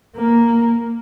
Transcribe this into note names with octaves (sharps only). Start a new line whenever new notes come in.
A#3